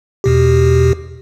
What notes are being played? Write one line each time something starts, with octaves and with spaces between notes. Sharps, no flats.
E2 B2 G4